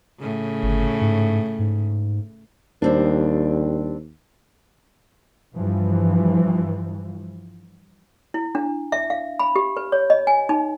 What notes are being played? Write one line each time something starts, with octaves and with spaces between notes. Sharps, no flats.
A2 C#3
G1
G#2
G#2
D#2 G3 C4 D4
G2 E3 F3
E4
D4
E5
F5
B5
G4
B4
C#5
D#5
G#5
D#4